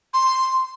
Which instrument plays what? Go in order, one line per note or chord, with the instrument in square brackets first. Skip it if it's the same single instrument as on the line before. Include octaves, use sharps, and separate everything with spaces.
[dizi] C6